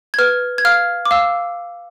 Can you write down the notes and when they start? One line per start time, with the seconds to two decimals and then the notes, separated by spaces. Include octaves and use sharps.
0.14 G#6
0.19 B4 F6
0.58 G#6
0.65 F5 F6
1.05 D6
1.11 F5 E6